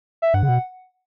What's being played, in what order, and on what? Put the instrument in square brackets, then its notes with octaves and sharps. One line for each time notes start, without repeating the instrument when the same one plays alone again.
[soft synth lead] E5
[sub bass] G2 [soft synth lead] F#5
[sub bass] C#3
B2